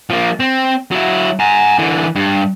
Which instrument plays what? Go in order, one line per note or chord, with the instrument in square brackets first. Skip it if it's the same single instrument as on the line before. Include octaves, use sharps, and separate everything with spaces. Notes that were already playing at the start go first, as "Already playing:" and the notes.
[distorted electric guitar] F3 A#3
C4
F#3 E4
G#5 A#5
D3 E3
G2